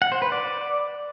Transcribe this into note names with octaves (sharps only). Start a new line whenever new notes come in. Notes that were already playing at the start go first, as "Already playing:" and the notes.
F#5
C5
B4
D5